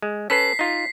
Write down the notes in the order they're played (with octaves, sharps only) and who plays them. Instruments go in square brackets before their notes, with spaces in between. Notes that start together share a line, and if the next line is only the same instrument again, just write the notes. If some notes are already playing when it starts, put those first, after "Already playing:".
[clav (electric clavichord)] G#3
[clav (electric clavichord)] C#4 A4 B4 [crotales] B6 C7
[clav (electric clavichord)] D#4 F4